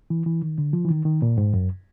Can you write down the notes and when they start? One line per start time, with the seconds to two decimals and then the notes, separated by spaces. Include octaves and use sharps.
0.10 E3
0.26 E3
0.42 D#3
0.58 D3
0.73 F3
0.85 E3
0.90 D#3
1.05 D#3
1.22 A#2
1.38 G#2
1.54 F#2